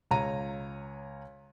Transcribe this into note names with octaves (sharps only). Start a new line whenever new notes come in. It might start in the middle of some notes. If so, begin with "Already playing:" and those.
C#2 C#5 A#5 D#7